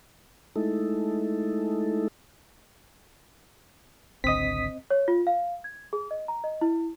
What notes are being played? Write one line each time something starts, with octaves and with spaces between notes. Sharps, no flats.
G#3 A3 D#4 E4 A4
G#1 C#2 D3 C4 D#5 D#6 B6
C#5
F4
F5
G#6
G#4
D#5
A#5
D#5
E4